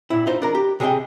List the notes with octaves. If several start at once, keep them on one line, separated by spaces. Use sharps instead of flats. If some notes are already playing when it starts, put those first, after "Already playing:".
A#2 E4
D#4 F4 C5
D4 A#4 A#5
G4
C3 G#4 C#5 D#5 G5